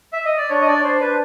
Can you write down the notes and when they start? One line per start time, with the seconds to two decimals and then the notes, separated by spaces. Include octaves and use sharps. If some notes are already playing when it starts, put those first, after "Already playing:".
0.13 E5
0.25 D#5
0.37 D5
0.49 D4 C#5
0.61 D#5
0.67 D4 D5
0.79 C#5
0.84 D4 C5
1.00 D4 B4